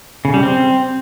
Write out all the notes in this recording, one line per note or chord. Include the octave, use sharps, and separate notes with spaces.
C#3
G3
C4